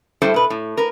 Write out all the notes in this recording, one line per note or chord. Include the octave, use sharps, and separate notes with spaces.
G2 G3 A3 E4 A4 C5
B2 B4
A2
A#4 B4